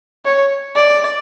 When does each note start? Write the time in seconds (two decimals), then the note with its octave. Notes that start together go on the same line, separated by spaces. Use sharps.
0.25 C#5
0.76 D5